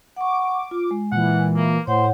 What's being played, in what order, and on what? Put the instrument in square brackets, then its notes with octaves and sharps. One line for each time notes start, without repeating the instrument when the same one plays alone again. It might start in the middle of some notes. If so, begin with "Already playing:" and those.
[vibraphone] F#5 C#6 [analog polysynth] D6
[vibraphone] F4
G#3
[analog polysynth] A#2 E3 [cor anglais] F#5
[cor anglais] A#3
[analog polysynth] A2 [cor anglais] C5 [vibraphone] C#5 F#5